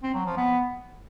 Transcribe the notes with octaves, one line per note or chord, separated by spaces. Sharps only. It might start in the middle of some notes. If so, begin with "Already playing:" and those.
C4
F#3
F3
B3